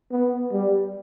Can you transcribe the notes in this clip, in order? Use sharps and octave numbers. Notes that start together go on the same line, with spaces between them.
B3
G3